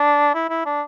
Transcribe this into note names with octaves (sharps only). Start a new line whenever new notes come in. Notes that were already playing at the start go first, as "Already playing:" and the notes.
Already playing: D4
E4
E4
D4